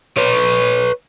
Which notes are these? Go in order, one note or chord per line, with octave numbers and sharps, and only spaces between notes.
B4 C#5